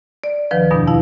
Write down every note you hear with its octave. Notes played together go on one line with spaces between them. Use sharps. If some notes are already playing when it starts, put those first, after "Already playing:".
D5
D2 D#3 F3 B4
E2 G2 B2 D4
F2 E4 F5